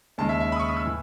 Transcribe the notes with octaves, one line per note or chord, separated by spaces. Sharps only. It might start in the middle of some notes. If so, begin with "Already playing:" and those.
D#2 C#3 G#3 A5
E5
E5
B5
D#6
C#6
D#6
E6
A2 E3